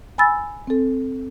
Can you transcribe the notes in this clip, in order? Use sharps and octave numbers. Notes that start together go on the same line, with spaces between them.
G#5 B5 E6 A6
C4 A4